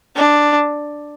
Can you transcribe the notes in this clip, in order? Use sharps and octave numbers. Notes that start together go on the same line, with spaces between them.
D4